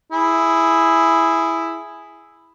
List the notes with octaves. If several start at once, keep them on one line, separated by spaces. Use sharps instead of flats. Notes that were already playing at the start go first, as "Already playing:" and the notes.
E4 G#4